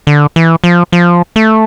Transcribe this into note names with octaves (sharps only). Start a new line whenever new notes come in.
D3
E3
F3
F3
A3